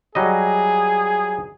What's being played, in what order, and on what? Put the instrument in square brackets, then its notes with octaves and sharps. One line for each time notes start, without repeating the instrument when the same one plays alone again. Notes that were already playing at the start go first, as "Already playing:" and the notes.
[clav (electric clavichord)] F#3 G3 D#5 [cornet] G#4